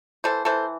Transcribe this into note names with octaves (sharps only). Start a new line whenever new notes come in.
E3 A4 C5
E3 A4 C5